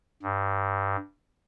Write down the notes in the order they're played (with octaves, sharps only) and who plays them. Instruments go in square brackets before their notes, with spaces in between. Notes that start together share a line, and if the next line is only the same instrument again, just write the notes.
[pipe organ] G2